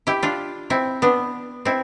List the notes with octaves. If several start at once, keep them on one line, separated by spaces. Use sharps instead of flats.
E4 G4
D4 F4
C4 E4
B3 D4
C4 E4